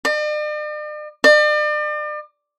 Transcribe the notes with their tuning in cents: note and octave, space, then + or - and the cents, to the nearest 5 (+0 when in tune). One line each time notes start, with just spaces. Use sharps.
D5 +45
D5 +40